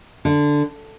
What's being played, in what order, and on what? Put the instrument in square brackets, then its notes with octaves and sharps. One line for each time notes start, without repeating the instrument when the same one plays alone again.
[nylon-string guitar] D3